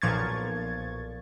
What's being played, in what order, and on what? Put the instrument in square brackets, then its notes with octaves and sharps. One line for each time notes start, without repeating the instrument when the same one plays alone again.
[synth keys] B1 A#2 F3 C#6 G#6 A6